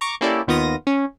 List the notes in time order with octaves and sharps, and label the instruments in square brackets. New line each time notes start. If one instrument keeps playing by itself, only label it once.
[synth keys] A#5 C#6 D6
A#3 C#4 E4 G4 A4 D5
D#2 D#3 B3 F4 D#6 A#6
C#4